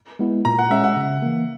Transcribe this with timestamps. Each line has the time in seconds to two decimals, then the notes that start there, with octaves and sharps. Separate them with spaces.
0.19 G#3 B3 E4
0.45 A#2 A#5
0.59 F#5
0.70 G#3 C#4 E5
0.84 F#5
0.97 C#3
1.22 E3 A#3